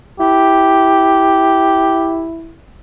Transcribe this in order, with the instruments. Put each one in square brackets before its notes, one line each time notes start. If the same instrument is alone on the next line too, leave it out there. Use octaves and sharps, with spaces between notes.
[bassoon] E4 [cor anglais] G4